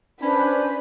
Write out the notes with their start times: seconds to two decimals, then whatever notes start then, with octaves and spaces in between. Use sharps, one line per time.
0.22 C#4 D4 B4 C5 B5